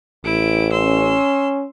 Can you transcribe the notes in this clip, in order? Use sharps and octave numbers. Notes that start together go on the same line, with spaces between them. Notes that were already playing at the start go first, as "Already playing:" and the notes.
A1 E4 D7
C#4 C6 E6